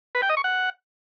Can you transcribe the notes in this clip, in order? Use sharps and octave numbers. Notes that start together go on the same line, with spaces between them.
B4
G5
D#5
C#6
F#5